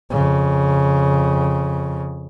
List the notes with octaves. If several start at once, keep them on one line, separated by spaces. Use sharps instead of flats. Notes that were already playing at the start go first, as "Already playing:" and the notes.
F2 C#3